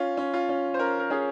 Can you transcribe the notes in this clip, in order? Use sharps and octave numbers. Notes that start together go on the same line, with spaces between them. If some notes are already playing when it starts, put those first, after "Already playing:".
Already playing: C#4 F4
C#4
F4
C#4
C5
C#4 A#4
A#4
C#4 G#4